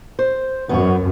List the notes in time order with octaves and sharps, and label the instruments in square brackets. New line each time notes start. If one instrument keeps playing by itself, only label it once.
[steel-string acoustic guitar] C5
[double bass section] F#2 [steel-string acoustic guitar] B3 C5 C#5